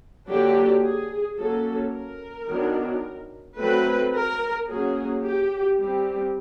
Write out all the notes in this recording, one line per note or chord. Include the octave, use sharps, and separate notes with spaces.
D3 F#3 A#3 D4 G4
G#4
F#3 A#3 C#4 A4
A#4
D#3 F#3 B3 D4
F#3 A3 C4 B4
A#4
F#3 A#3 C#4 G#4
G4
G3 C4 G4